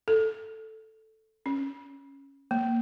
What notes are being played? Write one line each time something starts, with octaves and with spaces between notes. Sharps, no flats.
A4
C#4
A#3